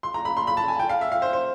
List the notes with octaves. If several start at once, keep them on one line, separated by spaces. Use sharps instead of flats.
C6
A#5
B5
C6
B5
A5
G#5
G5
F5
E5
F5
C5
C5